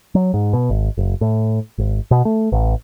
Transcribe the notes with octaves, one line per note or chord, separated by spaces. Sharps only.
F#3
G#2
B2
G#1
F#1
A2
G#1
B2
A3
A1